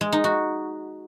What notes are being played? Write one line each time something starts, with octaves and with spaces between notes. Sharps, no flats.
G#3
D#4
F#4